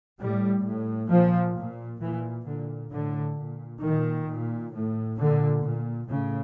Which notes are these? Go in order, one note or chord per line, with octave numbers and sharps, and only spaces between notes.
A2 G3
A2
A#2 F3
A#2
A#2 E3
A#2 D3
A2 D3
A#2
A#2 D#3
A#2
A2
A#2 D3
A#2
A2 C#3